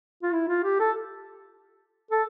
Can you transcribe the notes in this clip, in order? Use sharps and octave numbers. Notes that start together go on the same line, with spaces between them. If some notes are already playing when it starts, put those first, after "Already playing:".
F4
E4
F4
G4
A4
A4